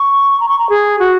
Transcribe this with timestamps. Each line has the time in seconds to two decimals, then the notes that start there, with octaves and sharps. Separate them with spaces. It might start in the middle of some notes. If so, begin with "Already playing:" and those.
Already playing: C#6
0.40 A#5
0.49 C#6
0.59 A#5
0.69 G#4
0.99 F#4